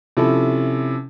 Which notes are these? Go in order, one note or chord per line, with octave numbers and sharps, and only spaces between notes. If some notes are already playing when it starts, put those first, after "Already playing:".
C3 F3 C#4 E4 A4